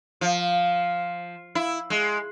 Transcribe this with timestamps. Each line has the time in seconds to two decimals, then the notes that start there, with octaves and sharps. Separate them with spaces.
0.21 F3
1.55 E4
1.90 G#3